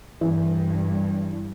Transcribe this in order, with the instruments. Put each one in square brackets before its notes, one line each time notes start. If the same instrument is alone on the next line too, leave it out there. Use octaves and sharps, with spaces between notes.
[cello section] G2 [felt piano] E3